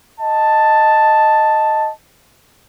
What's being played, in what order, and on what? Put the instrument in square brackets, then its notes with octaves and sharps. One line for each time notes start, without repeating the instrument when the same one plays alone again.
[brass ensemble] D#5 A5